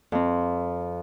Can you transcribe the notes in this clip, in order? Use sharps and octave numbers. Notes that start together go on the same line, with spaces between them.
F2 C4